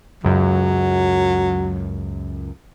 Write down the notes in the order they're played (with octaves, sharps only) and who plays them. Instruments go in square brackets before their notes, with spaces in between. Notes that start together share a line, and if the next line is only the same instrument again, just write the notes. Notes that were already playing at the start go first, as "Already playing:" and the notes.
[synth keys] C#2 F#2 [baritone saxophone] F#3